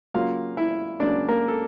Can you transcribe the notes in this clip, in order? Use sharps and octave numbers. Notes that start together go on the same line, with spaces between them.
C#3 F#3 A#3 F4 F5
E4 E5
C#3 F#3 A#3 D4 D5
A#3 A#4
A4